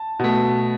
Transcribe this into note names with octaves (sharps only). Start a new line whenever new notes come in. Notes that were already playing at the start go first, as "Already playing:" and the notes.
Already playing: A5
B2 A3